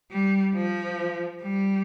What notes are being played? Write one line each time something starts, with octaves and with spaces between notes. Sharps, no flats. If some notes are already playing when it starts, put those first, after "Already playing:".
G3
F3
G3